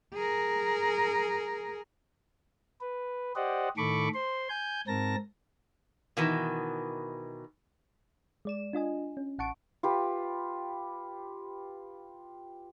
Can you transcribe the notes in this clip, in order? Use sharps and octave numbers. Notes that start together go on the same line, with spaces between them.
G#4 A#4
B4
G4 C5 D5 D#5 F#5
A2 D#3 A4 B5 C#6 D6
C5 C6
G#5 G6
G#2 C4 A#4 A5 A#6
B2 D#3 E3
G#3 D5 E7
D4 F4 D#5 G#5
C#4
A1 F#5 A5 C#6 D7
F4 G4 B4